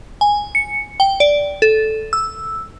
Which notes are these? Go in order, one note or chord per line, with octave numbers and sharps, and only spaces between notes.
G#5
C#7
G5
D5
A4
E6